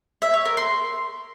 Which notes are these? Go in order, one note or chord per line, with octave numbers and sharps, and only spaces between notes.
E5
C#5
A#4
C6